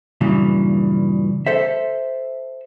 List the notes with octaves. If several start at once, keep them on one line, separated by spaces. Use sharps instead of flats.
G2 A#2 C#3 E3 F#3
A4 C5 E5